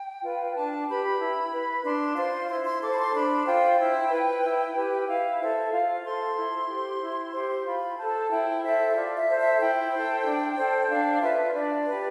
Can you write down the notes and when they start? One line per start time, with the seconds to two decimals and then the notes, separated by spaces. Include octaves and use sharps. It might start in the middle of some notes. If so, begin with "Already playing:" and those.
Already playing: G5
0.23 F4 B4
0.55 D4 A5
0.87 G4 B4 B5
1.20 E4
1.52 B4
1.84 D4 C6
2.17 F4 C5 C6
2.49 E4 C6
2.65 C6
2.81 A4 C5 D6
2.93 B5
2.98 C6
3.14 D4 B5
3.46 F4 C5 G5
3.78 E4
4.11 B4
4.43 E4
4.75 G4 B4
5.08 E4 F5
5.40 A4 C5 E5
5.72 F4 F5
6.05 A4 C5 C6
6.36 E4
6.69 G4 C5
7.02 E4
7.33 G4 C5
7.66 F4 B5
7.98 A4 C5 A5
8.31 E4 G5
8.63 A4 C5 E5
8.95 F4 D5
9.17 E5
9.28 A4 C5
9.39 E5
9.60 E4 G5
9.92 A4 C5
10.25 D4
10.57 A4 C5
10.90 D4 F5
11.21 F4 B4 E5
11.54 D4 D5
11.87 G4 B4